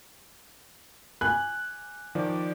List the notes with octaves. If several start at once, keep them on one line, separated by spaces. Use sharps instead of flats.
G#5 F#6
D#3 F3 D5